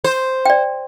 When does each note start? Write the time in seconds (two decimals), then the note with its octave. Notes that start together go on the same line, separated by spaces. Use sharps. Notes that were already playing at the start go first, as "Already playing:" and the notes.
0.04 C5
0.45 D5 G5